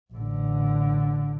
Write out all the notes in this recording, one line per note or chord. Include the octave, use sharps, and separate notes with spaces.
A1 D3